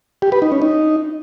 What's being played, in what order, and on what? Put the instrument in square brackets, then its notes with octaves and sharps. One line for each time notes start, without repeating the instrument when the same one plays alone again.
[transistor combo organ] G4
B4
D#4
C#4
D#4